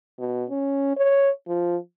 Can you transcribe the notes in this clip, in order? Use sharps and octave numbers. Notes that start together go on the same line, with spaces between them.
B2
C#4
C#5
F3